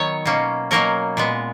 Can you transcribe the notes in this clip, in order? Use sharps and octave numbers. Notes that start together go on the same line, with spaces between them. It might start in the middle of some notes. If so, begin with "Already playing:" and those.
Already playing: D#3 F#3 B3 C#5
B2 A#3 C#4
B2 F#3 A#3 C#4 A#4
A#2 G#3 B3